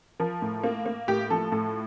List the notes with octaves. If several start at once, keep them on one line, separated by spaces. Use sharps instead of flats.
F3 A#4
A2
A#3
A#3
A2 G4
F3 A4
A2 A4